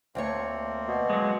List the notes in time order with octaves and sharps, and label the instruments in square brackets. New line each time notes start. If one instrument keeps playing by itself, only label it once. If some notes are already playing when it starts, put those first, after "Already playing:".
[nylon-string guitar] D2 A3 C#5 [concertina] A#3 C4
[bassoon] B2
[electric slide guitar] F#3 G#3